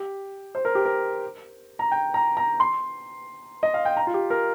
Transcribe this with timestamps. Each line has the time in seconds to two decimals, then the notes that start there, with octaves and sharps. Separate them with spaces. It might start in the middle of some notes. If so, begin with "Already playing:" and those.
Already playing: G4
0.55 C5
0.65 A#4
0.75 G4
0.85 A#4
1.79 A#5
1.92 G5
2.14 A#5
2.37 A#5
2.60 C6
3.63 D#5
3.74 F5
3.85 G5
3.97 A#5
4.07 F4
4.14 G4
4.30 A#4